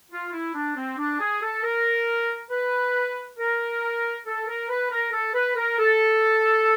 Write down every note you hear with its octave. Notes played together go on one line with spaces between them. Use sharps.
F4
E4
D4
C4
D4
G#4
A4
A#4
B4
A#4
A4
A#4
B4
A#4
A4
B4
A#4
A4